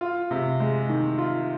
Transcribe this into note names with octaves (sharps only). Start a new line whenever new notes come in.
F4
C3
G#3
D#3
F4